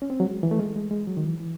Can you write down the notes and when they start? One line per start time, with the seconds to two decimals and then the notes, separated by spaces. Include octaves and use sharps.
0.02 C#4
0.10 C4
0.20 F#3
0.26 G#3
0.43 E3
0.51 A3
0.59 G#3
0.76 G#3
0.91 G#3
1.07 F#3
1.17 D#3
1.24 E3
1.40 E3